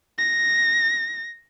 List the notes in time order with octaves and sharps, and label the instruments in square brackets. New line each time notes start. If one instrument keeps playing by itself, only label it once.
[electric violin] A#6